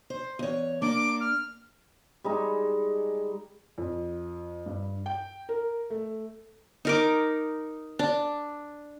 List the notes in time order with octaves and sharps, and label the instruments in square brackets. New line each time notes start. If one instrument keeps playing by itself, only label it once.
[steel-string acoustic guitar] C5
E2 C#5
[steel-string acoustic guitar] A#3 D4 A#4 [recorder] D6
[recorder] F6
[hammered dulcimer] G3 G#3 D#4
[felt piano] F2
G2
G5
A#4
A3
[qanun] D#4 A#4 D6
D4